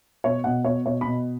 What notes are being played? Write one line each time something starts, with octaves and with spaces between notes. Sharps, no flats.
B2 C#5
B2 F#5
B2 C#5
B2 C#5
B5
B2